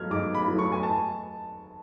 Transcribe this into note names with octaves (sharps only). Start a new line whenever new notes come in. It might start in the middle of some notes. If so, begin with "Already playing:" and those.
Already playing: G#2 F#3 A3 F6 G#6
G#2 D6
B5
F#3 A3
C#6
G#5
A5